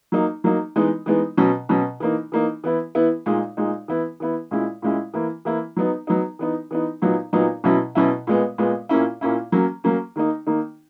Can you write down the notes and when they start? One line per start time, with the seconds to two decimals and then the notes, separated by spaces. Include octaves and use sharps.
0.12 F#3 A#3 D#4
0.44 F#3 A#3 D#4
0.76 E3 G#3 B3 D#4
1.06 E3 G#3 B3 D#4
1.37 B2 F#3 C#4
1.69 B2 F#3 C#4
2.00 E3 A#3 D#4
2.32 E3 A#3 D#4
2.64 E3 B3 E4
2.95 E3 B3 E4
3.26 A#2 G#3 D#4
3.57 A#2 G#3 D#4
3.88 E3 B3 E4
4.20 E3 B3 E4
4.51 A#2 G#3 C#4 E4
4.82 A#2 G#3 C#4 E4
5.14 E3 A#3 E4
5.45 E3 A#3 E4
5.77 F#3 B3 D#4
6.07 F#3 B3 D#4
6.39 E3 B3 D#4
6.71 E3 B3 D#4
7.02 A#2 F#3 B3 D#4
7.33 A#2 F#3 B3 D#4
7.64 B2 F#3 C#4 E4
7.95 B2 F#3 C#4 E4
8.27 A#2 G#3 B3
8.58 A#2 G#3 B3
8.89 A#2 A#3 C#4 E4
9.21 A#2 A#3 C#4 E4
9.52 F#3 A#3 C#4
9.84 F#3 A#3 C#4
10.16 D#3 A#3 D#4
10.47 D#3 A#3 D#4